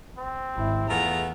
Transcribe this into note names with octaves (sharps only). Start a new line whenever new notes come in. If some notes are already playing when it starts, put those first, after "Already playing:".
C4
G#1 E4
E2 A3 B3 F4 G#4 A#5